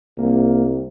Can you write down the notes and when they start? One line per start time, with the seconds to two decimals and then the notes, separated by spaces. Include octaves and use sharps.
0.18 C2 A#3